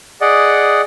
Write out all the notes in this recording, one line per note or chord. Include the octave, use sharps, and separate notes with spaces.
G#4 D5 D#5 F#5